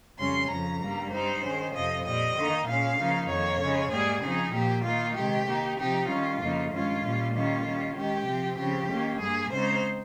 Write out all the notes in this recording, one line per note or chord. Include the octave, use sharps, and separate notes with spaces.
F2 C#3 G3 C#4 C6
F2 C#3 F3 A#5
G2 G3 A#3
G2 G3 C4 D#4 C5
D#3 G#3 C#4
F2 C3 F3 D#5
A#2 G3 C4 D#5
D#3 A#3 D#4
A#2 G#3 C#4 F5
C#3 F3 A#3 D#4
F2 D#3 A#3 C#5
C#3 G#3 D#4
G#2 G3 A#3 G#4
C#3 F3 C4 D#4 G#4
A#2 F3 A#3 G4
D#3 A#3 D#4 F4
C3 D#3 G#3 G4
D#3 A#3 D#4
C3 F3 C4 D#4 G4
D#3 G3 C#4 F4
F2 C#3 F3 A#3 D#4
G2 D#3 G#3 C#4 F4
A#2 G3 C#4
D#3 G3 A#3 C#4 F4
D#3 G3 C#4
D#3 G#3 C#4 G4
C3 F3 C4
C#3 F3 C4 G4
D#3 A#3 C#4
G2 G3 A#3 G#4
C#3 G#3 C4 D#4 C5